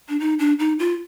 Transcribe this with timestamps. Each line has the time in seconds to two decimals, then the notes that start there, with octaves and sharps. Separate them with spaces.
0.09 D4
0.20 D#4
0.39 D4
0.59 D#4
0.79 F4